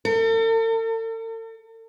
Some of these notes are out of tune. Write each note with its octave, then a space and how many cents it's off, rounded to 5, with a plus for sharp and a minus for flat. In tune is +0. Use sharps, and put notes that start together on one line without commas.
A4 +45